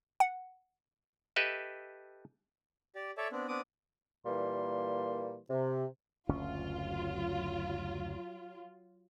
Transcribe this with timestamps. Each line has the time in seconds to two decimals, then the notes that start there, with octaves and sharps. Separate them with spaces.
0.20 F#5
1.36 G4 A4 B4 D#5 E5
2.95 G4 D5
3.17 A4 C#5 D5 E5
3.32 B3 C4 D4
3.48 B3 C4 D4 D6 D#6
4.25 A#2 E3 G3 A#3 C6
5.49 C3
6.29 F#1 D2 F#3 C#4 F4